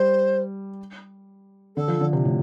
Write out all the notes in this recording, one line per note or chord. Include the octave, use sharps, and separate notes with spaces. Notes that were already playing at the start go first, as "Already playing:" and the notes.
Already playing: G3 C5
D3 A4
F3
D3
C3
A2